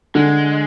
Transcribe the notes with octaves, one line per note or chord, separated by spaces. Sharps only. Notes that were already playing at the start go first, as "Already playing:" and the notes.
D3 G#3